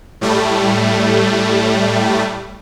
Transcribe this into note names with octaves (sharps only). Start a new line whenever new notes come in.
A2 G3 A3